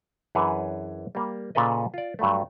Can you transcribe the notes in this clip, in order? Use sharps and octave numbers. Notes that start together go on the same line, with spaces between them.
F#2 E3 D4 G#4 B4 C#5
G3 A#3
A#2 C#3 A4 B4 D#5
F4 D5
G2 F#3 G3 A3